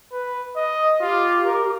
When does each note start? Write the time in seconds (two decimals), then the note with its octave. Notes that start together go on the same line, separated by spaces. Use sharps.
0.12 B4
0.56 D#5
1.01 F4 G4
1.45 A#4